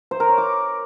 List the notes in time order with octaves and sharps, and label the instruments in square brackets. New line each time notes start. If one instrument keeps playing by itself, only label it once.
[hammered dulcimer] C5
A#4
C#5
D6